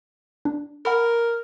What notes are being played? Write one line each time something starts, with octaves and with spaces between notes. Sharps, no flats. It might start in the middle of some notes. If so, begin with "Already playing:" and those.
D4
A#4 F#5 B5 F6